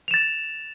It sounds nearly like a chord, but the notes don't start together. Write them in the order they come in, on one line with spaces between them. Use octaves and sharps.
F7 E7 A6